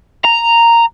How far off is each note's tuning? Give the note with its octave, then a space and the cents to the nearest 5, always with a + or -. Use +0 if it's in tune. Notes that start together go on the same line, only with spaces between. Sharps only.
A#5 -5